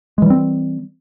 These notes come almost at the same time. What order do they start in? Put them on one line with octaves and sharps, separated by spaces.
G#3 E3 G3 C4